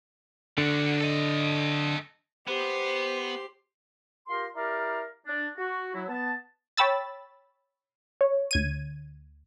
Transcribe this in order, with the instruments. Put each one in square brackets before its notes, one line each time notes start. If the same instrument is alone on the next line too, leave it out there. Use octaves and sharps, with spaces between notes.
[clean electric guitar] D3 [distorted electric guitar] D4 F#4
[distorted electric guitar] A4 D#5
[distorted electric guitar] B3 [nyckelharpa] G4 C6 [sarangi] C5
[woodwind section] F4 G4 A#4 C6
E4 G4 A#4 D5 F5 A#5
D4
F#4
F#3 E4
B3 A5
[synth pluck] C#5 G5 B5 E6 A6
C#5
D2 G#6 D#7